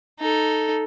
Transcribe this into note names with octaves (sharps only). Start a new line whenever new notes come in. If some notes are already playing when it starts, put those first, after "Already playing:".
D#4 A4